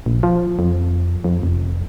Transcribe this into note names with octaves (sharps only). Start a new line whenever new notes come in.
A#1
F3
F2
F2
F1